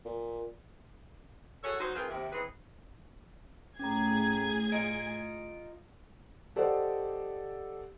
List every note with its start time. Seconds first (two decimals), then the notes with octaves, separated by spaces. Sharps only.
0.05 A#2
1.64 F#4 G#4 A4 C#5 F#5
1.80 F#3 D#4 F#4 C5
1.95 C4 F4 G#4 A#4 B4
2.08 D#2 C3
2.32 E3 C4 D#4 G#4 B4
3.79 A2 C#4 G#4 A#5 G#6
4.72 D#4 F4 D7
6.56 G4 A4 C5 D5 D#5 F#5